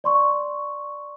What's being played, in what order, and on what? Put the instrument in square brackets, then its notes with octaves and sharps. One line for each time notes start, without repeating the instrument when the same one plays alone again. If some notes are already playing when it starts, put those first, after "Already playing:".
[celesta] D5 C6 C#6